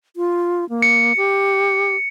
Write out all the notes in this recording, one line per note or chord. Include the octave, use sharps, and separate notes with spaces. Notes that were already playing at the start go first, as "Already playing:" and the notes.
F4
A#3
C#7
G4